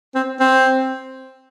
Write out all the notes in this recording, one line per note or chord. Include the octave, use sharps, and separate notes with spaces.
C4
C4